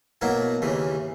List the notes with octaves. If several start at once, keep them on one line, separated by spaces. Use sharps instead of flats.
B2 F#3 A#3 E4
D#2 C#3 E3